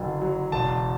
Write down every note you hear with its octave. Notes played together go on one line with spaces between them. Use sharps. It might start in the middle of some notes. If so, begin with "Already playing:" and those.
Already playing: F#1 D3 F#3
F#3
E1 A5